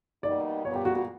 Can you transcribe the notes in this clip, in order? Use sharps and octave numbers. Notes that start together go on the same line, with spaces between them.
B2 G3 A#3 D#4 D5
A#2 G3 B3 C#5
G4
F#4
F#4